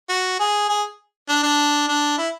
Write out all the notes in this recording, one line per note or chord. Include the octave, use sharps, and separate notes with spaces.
F#4
G#4
G#4
D4
D4
D4
E4